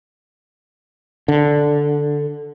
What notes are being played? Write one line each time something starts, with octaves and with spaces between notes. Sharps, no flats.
D3